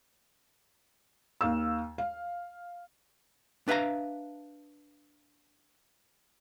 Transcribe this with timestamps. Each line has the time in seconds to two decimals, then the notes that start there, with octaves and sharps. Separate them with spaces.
1.41 D#2 F5 E6
1.98 F5
3.68 D4 B4 E5 F5 A#5